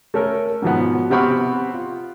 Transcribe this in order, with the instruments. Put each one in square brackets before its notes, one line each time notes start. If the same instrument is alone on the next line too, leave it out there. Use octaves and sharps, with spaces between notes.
[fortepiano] A3 C#4 A4 A#4
G#2 B2 F3 B3
C3 B3 C4 B5 C#6 F6
F4